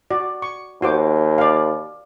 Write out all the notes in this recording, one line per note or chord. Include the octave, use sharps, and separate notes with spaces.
F#4 D5
C#6
D#2 F#4 C5 D6
D5 F5